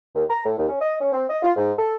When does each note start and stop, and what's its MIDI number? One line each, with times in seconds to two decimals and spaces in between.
0.15 0.23 39
0.29 0.40 82
0.44 0.56 45
0.57 0.67 39
0.69 0.77 61
0.81 0.94 75
0.99 1.12 61
1.13 1.24 60
1.29 1.38 75
1.43 1.51 65
1.56 1.72 44
1.78 1.95 69